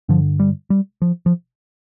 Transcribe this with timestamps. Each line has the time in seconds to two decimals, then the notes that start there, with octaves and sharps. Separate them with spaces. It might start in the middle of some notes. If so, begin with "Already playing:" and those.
0.09 G2 D3 F3
0.40 G3
0.70 G3
1.02 F3
1.26 F3